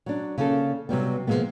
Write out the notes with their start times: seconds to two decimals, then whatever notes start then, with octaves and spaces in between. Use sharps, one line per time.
0.06 F#3 D4
0.38 C#3 A#3 A4
0.89 C3 F#3 G3 B3
1.27 C3 F3 F#3 G#3 A#3 B3